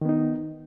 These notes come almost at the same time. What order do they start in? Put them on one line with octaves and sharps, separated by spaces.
D#3 B3 D#4